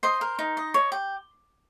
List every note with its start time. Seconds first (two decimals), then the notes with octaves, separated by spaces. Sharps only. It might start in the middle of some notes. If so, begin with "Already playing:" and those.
0.03 C5 D#5 C6
0.21 A#4
0.39 D#4
0.57 D#5
0.74 C#5
0.92 G4